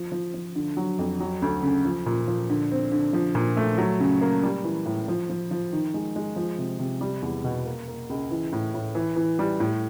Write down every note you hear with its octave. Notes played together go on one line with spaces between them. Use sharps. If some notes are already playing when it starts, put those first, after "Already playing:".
Already playing: F3
F3
F3
D3
F#3
F2
F#3
D2
C#3
F3
A#2
F3
D3
C4
D3
F3
A#2
A3
F#3
C#3
A#3
G3
E3
A2
F3
F3
F3
D#3
G#3
G#3
F3
C3
C3
G3
E2
B2
A#3
A#3
C#2
E3
A2
A2
E3
E3
G3
A2